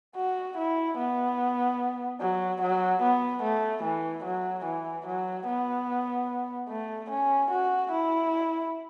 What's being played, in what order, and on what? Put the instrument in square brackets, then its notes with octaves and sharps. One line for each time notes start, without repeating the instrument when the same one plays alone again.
[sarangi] F#4
E4
B3
F#3
F#3
B3
A3
E3
F#3
E3
F#3
B3
A3
C#4
F#4
E4